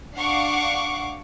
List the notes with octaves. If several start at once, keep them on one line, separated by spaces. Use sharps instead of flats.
D4 F5 F#5 C#6 D6 C7